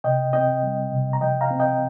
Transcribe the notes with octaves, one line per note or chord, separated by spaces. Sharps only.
C3 D#5 G5
C4 D#5 G5
G3
C3
A#5
F3 D#5 G5
F5 A#5
C4
D#5 G5